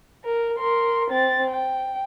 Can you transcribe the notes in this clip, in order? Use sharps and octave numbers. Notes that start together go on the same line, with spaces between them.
A#4
A#4 C6
C4 A6
G5